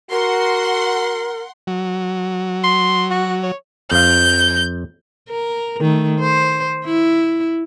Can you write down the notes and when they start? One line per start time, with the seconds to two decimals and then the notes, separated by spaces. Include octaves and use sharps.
0.11 F#4 A#4 F#5 C6
1.67 F#3
2.64 C6
3.10 F#4
3.43 C#5
3.92 F2 F5 G6
5.29 A#4
5.80 D#3 A3
6.19 C5
6.86 E4